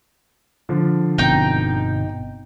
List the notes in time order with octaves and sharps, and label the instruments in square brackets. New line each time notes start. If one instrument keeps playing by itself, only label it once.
[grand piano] D3 F3
[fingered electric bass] G1 B2 C4 [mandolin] D#4 G5